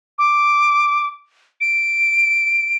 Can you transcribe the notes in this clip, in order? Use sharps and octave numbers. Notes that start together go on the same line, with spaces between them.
D6
D7